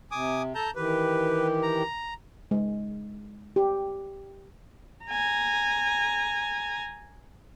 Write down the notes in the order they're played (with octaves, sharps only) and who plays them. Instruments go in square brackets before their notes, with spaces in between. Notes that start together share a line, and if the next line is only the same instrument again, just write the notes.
[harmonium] C3 [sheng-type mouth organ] G#5 D6 D#6
[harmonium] A4 [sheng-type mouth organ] A5 A#5 G6
[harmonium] D#3 E3 G4 [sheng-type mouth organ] B4
[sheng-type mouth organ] A#5
[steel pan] G#3
G4
[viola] G#5 A#5